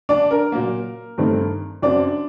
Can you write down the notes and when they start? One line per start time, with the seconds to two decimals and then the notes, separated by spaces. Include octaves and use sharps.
0.09 D4 D5
0.31 A#4
0.52 A#2 F#3 A#3
1.18 G2 D#3 A3 C4
1.82 F#2 F#3 C4 D4 D5